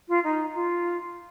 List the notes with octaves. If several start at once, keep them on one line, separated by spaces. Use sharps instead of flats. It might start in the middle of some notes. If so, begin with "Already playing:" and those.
F4
D#4
F4